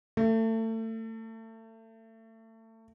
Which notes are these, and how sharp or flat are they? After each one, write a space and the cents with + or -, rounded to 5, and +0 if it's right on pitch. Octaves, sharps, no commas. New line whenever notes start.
A3 +30